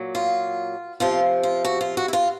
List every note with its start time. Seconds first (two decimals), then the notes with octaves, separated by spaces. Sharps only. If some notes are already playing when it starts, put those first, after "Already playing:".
Already playing: A#2 F#3
0.15 F4
1.00 C3 F3 F4
1.43 F4
1.65 F#4
1.81 F4
1.97 F#4
2.08 E4
2.13 F4